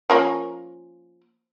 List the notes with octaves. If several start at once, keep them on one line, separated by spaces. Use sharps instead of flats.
F3 A#3 C#4